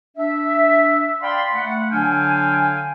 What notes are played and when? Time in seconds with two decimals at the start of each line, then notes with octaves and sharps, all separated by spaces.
0.17 D4 E5
1.22 D5 F5 G5 A5 B5 C6
1.53 A3 F#5
1.90 D3 F#3 D4 F5 G5 G#5